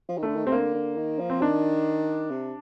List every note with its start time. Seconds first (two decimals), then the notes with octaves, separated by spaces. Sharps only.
0.09 F3
0.18 D#3
0.23 D3 A3
0.36 D#3
0.45 C3 C4
0.52 D3 A#3
0.75 D3
0.97 D#3
1.19 F3
1.30 C4
1.41 D#3 D4
2.31 C3